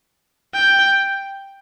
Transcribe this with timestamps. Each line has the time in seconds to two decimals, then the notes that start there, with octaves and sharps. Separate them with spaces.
0.54 G5